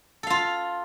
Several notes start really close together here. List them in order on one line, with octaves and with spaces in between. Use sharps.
A4 F5 F4